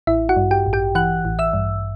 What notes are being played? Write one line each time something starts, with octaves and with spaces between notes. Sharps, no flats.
A1 E4 E5
F#4 F#5
G2
G4 G5
A1
G4 G5
E3 F#5 F#6
A1
E5 E6
G2